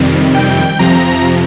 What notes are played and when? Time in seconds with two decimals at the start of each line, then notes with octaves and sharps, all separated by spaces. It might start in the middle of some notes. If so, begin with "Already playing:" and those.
Already playing: F2 C3 D#3 G3
0.35 G5
0.79 F2 C3 F3 A#5